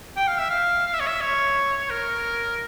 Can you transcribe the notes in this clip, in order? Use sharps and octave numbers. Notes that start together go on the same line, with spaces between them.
G5
F5
E5
F5
F5
E5
C#5
E5
C#5
A#4